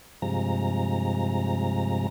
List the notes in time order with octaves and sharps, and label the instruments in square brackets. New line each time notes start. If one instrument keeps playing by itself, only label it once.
[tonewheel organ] G2 C3 F3 G#3 A#5